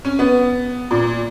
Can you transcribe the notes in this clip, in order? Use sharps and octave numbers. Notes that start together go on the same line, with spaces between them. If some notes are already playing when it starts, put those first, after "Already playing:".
C#4
B3
A#2